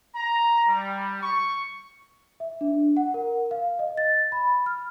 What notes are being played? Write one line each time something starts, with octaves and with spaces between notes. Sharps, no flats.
A#5
G3
C#6
E5
D4
F#5
A#4
F5
D#5
A6
B5
F6